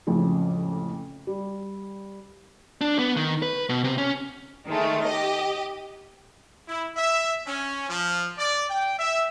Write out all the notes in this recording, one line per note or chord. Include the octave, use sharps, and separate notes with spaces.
A1 F2 A2 C#3 F3 G#3
G3
D4
B3
D#3
B4
B2
C3
C#4
D#3 G#3 A3
G4 D#5
E4
E5
C#4
F3
D5
G5
E5